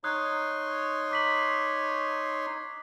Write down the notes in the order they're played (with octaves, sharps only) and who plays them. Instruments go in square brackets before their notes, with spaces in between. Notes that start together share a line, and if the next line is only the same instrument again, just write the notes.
[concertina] D#4 C#5 C6 [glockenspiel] D#6 F#6
[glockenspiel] D6 B6 F#7